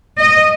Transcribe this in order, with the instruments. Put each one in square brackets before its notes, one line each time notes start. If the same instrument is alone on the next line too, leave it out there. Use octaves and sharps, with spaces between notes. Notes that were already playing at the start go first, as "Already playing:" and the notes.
[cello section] D#5